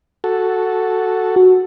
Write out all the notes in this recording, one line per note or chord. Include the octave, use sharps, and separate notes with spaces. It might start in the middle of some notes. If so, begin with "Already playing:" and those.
F#4 A4
F#4